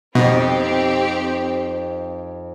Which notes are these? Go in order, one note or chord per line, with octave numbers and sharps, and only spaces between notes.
F2 B2 C4 D#4 G4